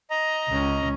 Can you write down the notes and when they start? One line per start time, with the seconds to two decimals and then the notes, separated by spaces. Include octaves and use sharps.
0.11 D#5 A#5
0.49 C#2 C#4